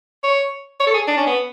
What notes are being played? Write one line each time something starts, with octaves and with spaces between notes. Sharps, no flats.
C#5
C#5
A4
G#4
D4
C#4
B3